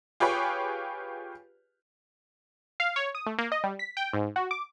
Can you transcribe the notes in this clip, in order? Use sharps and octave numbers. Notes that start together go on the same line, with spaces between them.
F4 G4 G#4 B4 C#5
F5
C#5
D#6
A3
A#3
D#5
G3
B6
G5
G#2
F#4
D6